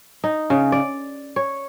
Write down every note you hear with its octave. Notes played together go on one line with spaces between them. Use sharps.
D#4
C#3
D5
C#5